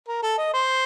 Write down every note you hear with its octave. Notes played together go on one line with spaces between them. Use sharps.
A#4
A4
D#5
C5